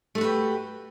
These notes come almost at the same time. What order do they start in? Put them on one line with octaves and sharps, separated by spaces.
A3 F#4 B4 G4